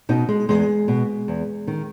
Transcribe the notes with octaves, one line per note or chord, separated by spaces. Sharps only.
B2 D#4
G#3
E2 G#3
B2
E2
D#3